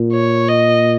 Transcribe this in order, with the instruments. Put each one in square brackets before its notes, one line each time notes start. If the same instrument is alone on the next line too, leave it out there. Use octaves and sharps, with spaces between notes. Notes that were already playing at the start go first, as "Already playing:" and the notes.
Already playing: [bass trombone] A#2
[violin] C#5
D#5